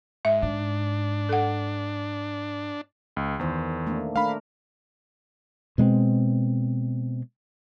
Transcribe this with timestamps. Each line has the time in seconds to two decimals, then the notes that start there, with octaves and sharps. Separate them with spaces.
0.25 G#2 E5
0.42 G#2 D4
1.29 A4 F#5
3.17 C#2
3.39 E2 D#3 C5
3.87 A3 A#3 D4
4.16 A3 D4 A#4 F5 B5
5.78 B2 G#3 A#3 C4